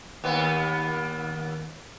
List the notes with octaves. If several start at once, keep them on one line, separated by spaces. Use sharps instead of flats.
D#2 B3